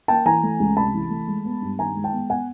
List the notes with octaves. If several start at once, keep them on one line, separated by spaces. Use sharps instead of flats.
A#3 G5 A5
E3 G#5 A#5
A3
C#2
C3 A5 B5
E3
A3
G#3
B3
G2
D#3 G#5 A#5
G#3
G5 A5
B3
B3 F#5 G#5